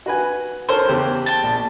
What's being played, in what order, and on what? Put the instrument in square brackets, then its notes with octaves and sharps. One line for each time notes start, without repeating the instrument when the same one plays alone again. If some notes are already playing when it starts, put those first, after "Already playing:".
[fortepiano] F#4 B4 G#5
[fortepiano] A4 A#4 C#5 [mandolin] C5
[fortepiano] E2 C#3 G4
[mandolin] G5 A5
[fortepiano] A#1